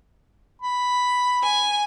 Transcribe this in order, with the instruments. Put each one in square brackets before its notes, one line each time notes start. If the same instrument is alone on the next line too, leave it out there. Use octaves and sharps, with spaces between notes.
[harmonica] B5
[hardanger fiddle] G#5